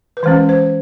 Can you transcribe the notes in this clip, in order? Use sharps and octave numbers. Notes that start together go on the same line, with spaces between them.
B4
E3 G#3 C#4 C5
C5